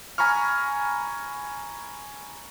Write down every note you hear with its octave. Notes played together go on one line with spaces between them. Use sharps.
G#5 A#5 B5 C#6 F6